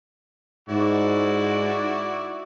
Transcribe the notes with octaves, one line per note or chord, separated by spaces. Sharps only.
G#2 E4 F#4 D5